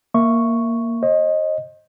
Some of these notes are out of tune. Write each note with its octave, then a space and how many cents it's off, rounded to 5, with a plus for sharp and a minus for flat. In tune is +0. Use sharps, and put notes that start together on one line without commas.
A#3 +0 E5 +10 C#6 +0
C5 +45 D#5 +0